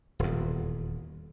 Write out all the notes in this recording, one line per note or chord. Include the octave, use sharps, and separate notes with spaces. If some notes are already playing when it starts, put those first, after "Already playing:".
D#1 E2